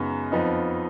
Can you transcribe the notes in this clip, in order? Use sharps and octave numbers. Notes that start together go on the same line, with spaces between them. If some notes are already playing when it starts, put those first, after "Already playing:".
Already playing: F#2 C#3 G#3 B3 D#4
F2 F3 B3 D#4